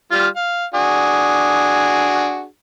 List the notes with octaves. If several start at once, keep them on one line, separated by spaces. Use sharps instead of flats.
G3 F4 F6
F5
D4 F#4 G#4